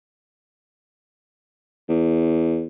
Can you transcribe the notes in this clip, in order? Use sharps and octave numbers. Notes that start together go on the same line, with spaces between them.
E2